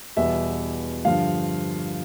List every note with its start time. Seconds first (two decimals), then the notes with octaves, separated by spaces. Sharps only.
0.17 E2 B2 G3 E5
1.05 G2 D3 F3 F5